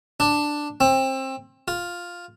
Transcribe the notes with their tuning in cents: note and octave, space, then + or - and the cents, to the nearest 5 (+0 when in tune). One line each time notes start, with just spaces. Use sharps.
D4 +5
C4 +25
F4 +5